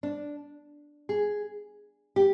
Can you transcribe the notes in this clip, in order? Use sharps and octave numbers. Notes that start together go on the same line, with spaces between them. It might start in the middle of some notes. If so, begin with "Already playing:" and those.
D4
G#4
G4